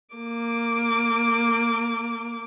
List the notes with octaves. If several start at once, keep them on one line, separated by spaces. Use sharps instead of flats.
A#3 D6